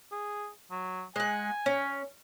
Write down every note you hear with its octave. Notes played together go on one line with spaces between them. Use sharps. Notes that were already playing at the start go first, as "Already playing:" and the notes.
G#4
F#3
G#3 F#5 G#5
C#4